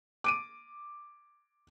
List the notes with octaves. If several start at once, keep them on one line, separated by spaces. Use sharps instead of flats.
D6 D7 D#7